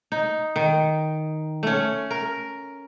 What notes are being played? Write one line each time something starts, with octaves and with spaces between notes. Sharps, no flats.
D#4
D#3
A3 C#4
A#4